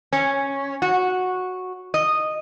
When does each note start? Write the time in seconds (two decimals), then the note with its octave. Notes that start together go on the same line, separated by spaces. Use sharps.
0.13 C#4
0.82 F#4
1.94 D#5